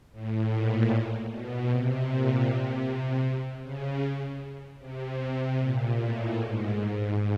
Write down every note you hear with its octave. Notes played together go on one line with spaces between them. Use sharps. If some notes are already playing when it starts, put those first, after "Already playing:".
A2
A#2
B2
C3
A#2
C3
C#3
C3
A#2
A2
G#2